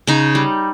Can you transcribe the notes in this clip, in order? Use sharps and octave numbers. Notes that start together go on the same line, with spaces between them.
C#3 D#4
G3